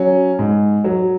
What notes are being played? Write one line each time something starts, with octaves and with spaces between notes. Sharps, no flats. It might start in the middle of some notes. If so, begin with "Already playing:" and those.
Already playing: F#3 C#4
G#2
F#3